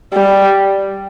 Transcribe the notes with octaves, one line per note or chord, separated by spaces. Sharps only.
G3